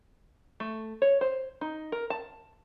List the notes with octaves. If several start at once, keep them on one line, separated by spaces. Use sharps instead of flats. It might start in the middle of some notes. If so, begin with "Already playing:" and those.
A3
C#5
C5
D#4
A#4
A5